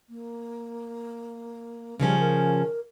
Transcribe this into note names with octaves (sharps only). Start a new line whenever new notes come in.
A#3
C#3 F3 G3 C#4
A#4